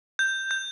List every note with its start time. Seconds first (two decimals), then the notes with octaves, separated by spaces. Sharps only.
0.19 G6
0.51 G6